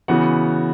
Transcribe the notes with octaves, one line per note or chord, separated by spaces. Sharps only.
C#3 E3 B3 F#4 F#5